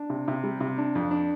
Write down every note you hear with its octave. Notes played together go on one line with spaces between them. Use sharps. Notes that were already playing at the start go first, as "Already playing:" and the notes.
Already playing: D4
C3
C3
G3
C3
D4
F2
D4